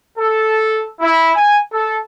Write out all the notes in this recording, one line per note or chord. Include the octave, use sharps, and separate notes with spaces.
A4
E4
G#5
A4